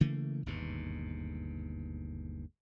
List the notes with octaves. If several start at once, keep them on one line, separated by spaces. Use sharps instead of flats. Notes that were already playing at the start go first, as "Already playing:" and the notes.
C#3 E3 A3 A#3
G1 D#2 G#2 B2